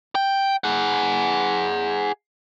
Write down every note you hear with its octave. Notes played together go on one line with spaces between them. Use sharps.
G5
G#4 F#5